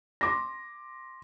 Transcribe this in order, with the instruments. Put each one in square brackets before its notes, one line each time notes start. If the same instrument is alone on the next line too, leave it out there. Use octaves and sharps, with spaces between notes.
[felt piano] C6 D6 A#6